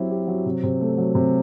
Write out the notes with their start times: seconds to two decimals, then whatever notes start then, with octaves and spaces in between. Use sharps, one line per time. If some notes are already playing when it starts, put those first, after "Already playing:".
Already playing: F#3 C4 E4 G4
0.10 G4
0.28 F#3
0.46 C3
0.63 C3
0.81 A3
0.98 F#3
1.15 C3